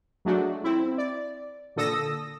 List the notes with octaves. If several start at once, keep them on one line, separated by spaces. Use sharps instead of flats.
F#3 G#3 A3 D4 F#4
C4 E4
D5
A#2 D3 A4 D#6 E6 A#6